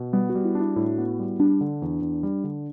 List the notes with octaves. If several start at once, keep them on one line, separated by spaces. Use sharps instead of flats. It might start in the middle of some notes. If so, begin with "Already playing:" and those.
Already playing: B2
G3 B3
F#4
G3
E4
D4
E4
A2 E4
B3
G3
G3 D4
D3
E2
E2
G3
D3